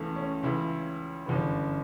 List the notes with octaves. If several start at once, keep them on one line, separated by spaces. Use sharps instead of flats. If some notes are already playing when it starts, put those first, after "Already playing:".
Already playing: C#2 C#3 E3 A3
C#4
C#2 C#3 E3 E4
G1 F#2 C#3 E3